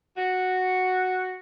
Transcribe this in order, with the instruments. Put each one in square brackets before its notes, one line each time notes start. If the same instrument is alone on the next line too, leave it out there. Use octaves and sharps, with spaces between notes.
[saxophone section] F#4